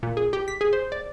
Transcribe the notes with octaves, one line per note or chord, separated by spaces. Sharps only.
A#2
G#4
G4
B6
G#4
C5
D5